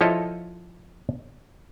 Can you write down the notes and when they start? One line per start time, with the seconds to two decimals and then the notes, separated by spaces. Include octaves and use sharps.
0.01 F3 E4 A4 C#5 D#5